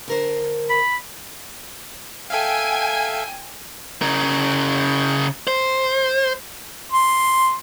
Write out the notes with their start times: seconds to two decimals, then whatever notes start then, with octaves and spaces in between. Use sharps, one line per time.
0.08 D3 A#4 C5
0.70 B5
2.30 A4 E5 F5 G5 G#5
4.02 C#3 A#4
5.47 C5
6.92 C6